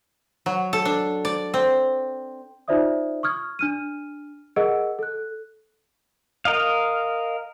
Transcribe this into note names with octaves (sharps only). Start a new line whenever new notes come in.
F#3
A4
D4
D5
C4
D#4 F4 C5 D5 E5 D#6
C#6 D#6 F6 G#6
D4 F6 D#7
G#4 A#4 D#5 F#5 E6 D7
A4 F#6
A#4 D#5 F5